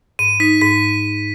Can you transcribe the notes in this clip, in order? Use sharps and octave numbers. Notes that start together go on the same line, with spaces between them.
G#2 D#7
D#4 B6
G#2 B6